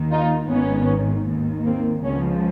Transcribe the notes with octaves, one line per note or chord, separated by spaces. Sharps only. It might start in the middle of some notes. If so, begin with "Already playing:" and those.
Already playing: D#2 D#3
D#4 F4
G#1 G#2 D#3 B3 C#4
D#2 D#3
A#3 C4
C#2 C#3 F3 B3 C#4